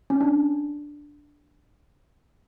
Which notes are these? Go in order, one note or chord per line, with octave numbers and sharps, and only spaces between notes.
C#4
D4